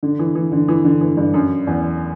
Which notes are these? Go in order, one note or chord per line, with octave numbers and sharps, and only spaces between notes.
D3
E3
E3
D3
E3
D3
E3
G2
F#2
E2